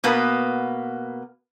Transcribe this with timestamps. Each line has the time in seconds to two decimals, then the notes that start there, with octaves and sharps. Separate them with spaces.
0.04 B2 A#3 B3